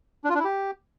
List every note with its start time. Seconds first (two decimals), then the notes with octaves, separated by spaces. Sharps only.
0.24 D4
0.29 F4
0.34 D4
0.39 E4
0.44 G4